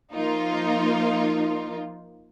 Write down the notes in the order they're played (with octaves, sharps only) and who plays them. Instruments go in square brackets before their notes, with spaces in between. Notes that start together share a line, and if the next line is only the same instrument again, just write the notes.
[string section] F3 A#3 D#4 F4